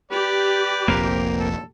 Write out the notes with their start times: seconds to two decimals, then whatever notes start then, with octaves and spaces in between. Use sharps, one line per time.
0.12 G4 B4 D5
0.88 F1 A#1 A#2 A#3 C4 A#4
1.40 A4